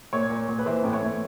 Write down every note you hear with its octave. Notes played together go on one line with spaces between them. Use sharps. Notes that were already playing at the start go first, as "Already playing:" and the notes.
A#2 C#5
A#2
A#2
B4
E3 C5
A2
C#5
A2